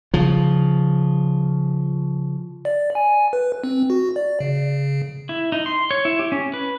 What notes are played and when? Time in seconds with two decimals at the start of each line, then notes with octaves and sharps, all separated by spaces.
0.14 C#3 F3
2.65 D5
2.95 G#5
3.33 B4
3.64 C4
3.90 F#4
4.16 D5
4.40 C#3
5.29 E4
5.52 D#4
5.66 C6
5.91 C#5
6.05 E4
6.19 G4
6.32 C#4
6.54 B4